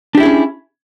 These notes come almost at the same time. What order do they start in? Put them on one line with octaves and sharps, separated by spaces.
D4 G4 E4 G#4 C#4